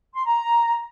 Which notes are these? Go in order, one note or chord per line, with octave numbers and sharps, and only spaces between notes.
C6
A#5